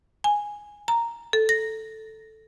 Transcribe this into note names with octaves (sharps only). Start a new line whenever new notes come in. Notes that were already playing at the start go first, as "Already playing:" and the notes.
G#5
A#5
A4
A#6